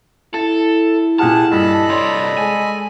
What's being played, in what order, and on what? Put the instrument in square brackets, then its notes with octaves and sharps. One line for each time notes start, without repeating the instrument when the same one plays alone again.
[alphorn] E4 [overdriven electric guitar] A4 [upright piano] A6
[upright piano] A#2 G4 F6 [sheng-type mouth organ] G#4 F#5 [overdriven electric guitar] A5
[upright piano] G2 [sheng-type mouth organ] A4 D#5 B5
[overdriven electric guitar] C2 C#5 [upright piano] D5 C6
[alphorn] G#3 [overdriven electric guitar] G#5